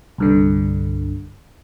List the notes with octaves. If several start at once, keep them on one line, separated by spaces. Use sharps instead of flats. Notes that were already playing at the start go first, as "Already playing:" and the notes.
C2 G2 D3